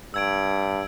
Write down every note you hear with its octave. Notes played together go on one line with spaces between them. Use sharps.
G2 E6 G#6 D7